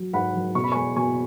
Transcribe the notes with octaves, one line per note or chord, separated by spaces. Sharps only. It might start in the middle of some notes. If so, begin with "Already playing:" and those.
Already playing: F#3
G#2 F#5 B5
F#3
B2 C#6
B5
G#3 G#5 C#6
B2 G#5 C#6